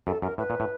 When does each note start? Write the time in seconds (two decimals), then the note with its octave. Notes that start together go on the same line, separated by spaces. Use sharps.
0.07 F#2 A4
0.22 F#2 A#4
0.38 A2 B4
0.50 A#2
0.60 A2